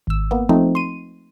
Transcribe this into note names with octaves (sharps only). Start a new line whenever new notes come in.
G#1 E6
A#3 B3
F3 A3 C4 D#4
C6 D#7